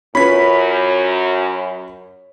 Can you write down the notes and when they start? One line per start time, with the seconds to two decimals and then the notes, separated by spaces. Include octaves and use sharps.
0.15 F#2 C#4 F4 B4 C#5 B5 B6